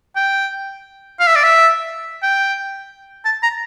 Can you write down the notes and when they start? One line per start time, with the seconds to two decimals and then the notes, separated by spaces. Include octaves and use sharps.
0.16 G5
1.19 F5
1.27 E5
1.36 D5
1.43 E5
2.22 G5
3.25 A5
3.43 A#5